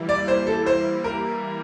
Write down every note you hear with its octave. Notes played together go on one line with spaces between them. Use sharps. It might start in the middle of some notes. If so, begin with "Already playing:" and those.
Already playing: E3 G3 A#3 E4
D5
C5
A4
C5
A#4